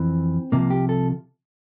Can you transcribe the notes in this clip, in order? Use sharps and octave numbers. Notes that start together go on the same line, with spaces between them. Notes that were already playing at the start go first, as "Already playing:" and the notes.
Already playing: F2 E3 C4
C2 C3 F3 A#3
G4
A4